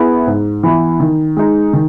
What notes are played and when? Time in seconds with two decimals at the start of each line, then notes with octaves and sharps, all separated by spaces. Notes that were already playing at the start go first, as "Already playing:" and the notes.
Already playing: B3 E4 G#4
0.27 G#2
0.63 E3 B3 E4
1.00 D#3
1.37 G#3 D#4
1.73 D#3